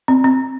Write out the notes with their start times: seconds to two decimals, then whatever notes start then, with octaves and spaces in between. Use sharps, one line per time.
0.08 C4
0.24 C4